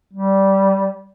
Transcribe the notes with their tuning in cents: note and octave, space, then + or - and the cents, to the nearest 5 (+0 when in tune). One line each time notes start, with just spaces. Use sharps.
G3 -15